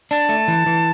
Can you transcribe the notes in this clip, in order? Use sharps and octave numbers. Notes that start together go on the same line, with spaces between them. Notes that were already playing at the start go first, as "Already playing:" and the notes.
D4 A5
A3
E3
E3